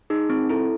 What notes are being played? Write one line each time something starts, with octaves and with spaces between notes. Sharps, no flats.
D#4 G#4
C4
E4 A4